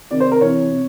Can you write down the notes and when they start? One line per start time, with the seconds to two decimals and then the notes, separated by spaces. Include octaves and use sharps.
0.11 C3 D#3 D5
0.20 C5
0.32 A#4
0.41 C3 E3 C#5
0.72 C3